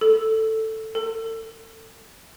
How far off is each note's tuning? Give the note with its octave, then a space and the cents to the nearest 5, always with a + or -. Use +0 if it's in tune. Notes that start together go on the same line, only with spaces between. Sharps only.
A4 +5
A4 +35